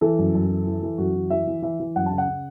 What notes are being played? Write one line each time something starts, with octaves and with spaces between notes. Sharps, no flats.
E3 A4
F#2
F#2
E3
E3
E3
F#2 F#4
E3
E3 E5
E3
E3 E5
E3
F#2 F#5
A5
C#3
F#5
C#3